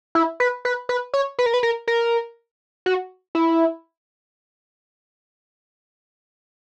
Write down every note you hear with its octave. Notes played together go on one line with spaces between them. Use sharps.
E4
B4
B4
B4
C#5
B4
A#4
B4
A#4
A#4
F#4
E4